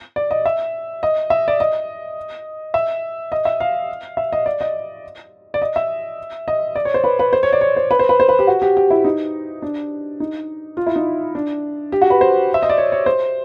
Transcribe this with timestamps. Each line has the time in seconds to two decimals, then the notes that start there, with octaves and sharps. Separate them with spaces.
0.16 D5
0.31 D#5
0.46 E5
1.03 D#5
1.30 E5
1.48 D5
1.60 D#5
2.74 E5
3.32 D#5
3.45 E5
3.60 F5
4.17 E5
4.33 D#5
4.46 D5
4.61 D#5
5.54 D5
5.62 D#5
5.76 E5
6.48 D#5
6.76 D5
6.85 C#5
6.94 C5
7.04 B4
7.19 B4
7.33 C5
7.43 C#5
7.53 D5
7.61 C#5
7.77 C5
7.91 B4
7.99 C5
8.09 B4
8.20 C5
8.29 B4
8.39 G4
8.47 F#4
8.62 G4
8.77 G4
8.90 E4
9.04 D#4
9.62 D4
10.20 D#4
10.77 F4
10.87 E4
10.96 D#4
11.35 D4
11.92 G4
12.02 F#4
12.10 B4
12.21 C5
12.54 E5
12.63 D#5
12.69 D5
12.78 C#5
12.92 C#5
13.06 C5